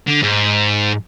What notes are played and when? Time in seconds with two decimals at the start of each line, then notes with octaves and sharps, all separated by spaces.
0.07 D3
0.23 G#2